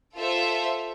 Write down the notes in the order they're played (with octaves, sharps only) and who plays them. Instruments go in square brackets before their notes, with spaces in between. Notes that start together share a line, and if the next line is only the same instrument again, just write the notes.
[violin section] F4 A4 C5 E5